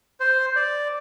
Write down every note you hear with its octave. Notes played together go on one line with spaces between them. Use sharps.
C5
D5